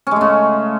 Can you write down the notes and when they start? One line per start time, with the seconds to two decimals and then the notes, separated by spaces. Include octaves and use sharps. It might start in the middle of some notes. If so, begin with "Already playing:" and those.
0.07 C#4
0.11 G#3
0.16 A3
0.21 C#3